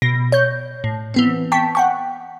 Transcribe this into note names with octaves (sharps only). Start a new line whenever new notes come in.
B2 A#6
C#5 G6
A2
E3 B3 C4
G5 A5 C#6 B6
F#5 G5 C#6